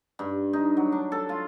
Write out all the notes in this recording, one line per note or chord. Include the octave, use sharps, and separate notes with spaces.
G2
D#4
F#3
D4
A4
F4